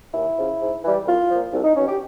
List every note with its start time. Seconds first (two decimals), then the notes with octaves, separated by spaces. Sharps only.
0.14 D#2 E4
0.37 C#3 F3
0.60 G#2
0.83 E3 G3
1.06 C2 F4
1.29 A#2 F3
1.53 C2
1.64 D#4
1.76 B2 F#3 C#4
1.88 G4